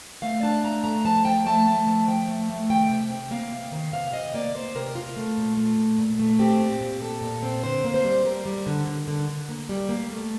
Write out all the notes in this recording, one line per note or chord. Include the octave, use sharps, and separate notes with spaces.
A3 F5
D4 A5
A3 A#5
A3 A#5
F3 A5
F3 G5
A3 A5
A3
F3
F3 G5
A3
A3
D#3 G5
C3
C3
A#3 F5
C3
D#3
C3 F5
C3 D#5
A#3 D5
A#3 C5
C3 A#4
C3 F4
A3
A#2
A3
A#2
A#2
A3
C4 G4
A#2
A#2
A#2 A4
A#2
C4
D3 C5
A#3
C5
G3
G3 A#4
G3
D3
D3
D3
D3
A#3
G3
A#3
A3